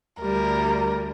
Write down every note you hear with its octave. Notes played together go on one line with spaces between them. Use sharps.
D2 D3 G3 A#4